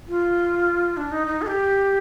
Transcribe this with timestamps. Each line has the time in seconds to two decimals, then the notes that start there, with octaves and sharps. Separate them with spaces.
0.09 F4
0.97 D4
1.12 D#4
1.27 D#4
1.42 A4
1.47 G4